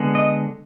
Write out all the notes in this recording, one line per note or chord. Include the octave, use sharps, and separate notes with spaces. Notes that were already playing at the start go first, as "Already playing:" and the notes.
Already playing: D3 G#3 B3
D#5